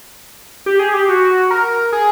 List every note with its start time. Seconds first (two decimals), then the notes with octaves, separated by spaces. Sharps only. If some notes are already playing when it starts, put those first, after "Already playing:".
0.66 G4
0.79 G#4
0.94 G4
1.09 F#4
1.51 A#4
1.92 G#4